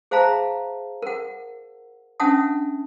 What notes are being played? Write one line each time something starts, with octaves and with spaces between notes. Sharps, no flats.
G#4 C5 E5 F5 A5 A#5
A#4 F#5
C#4 D4 E5 F#5 A5 D#6